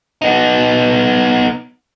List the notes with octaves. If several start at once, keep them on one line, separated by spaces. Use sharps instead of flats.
B3 D#4